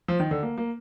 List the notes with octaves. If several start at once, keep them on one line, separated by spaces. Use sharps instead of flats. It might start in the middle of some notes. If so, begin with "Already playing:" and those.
F3
D#3
D3
A#3
A#3